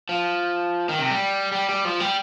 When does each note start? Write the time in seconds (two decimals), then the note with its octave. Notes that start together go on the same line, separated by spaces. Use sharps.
0.09 F3
0.89 D#3
0.99 C3
1.10 G3
1.52 G3
1.69 G3
1.85 F3
2.00 G3